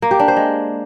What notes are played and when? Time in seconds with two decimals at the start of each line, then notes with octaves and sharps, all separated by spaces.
0.02 A#3
0.11 G4
0.19 D4
0.28 C5
0.37 G#3